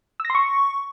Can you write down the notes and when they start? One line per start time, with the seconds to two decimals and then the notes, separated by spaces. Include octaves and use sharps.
0.20 E6
0.25 A#6
0.30 C6
0.35 C#6